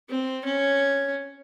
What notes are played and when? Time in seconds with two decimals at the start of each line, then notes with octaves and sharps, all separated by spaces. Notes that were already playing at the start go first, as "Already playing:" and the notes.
0.09 C4
0.45 C#4